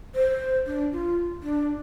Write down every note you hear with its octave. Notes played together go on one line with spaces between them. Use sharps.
C5
D4
F4
D4